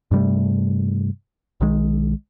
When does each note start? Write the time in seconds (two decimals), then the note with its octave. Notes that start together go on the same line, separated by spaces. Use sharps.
0.11 G2 C3 G3 A3
1.61 B1 D#3 G#3